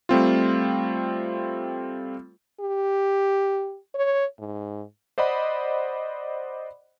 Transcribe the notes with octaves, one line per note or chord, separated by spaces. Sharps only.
G3 A3 C4 F4
G4
C#5
G#2
C5 D5 D#5 F#5 B5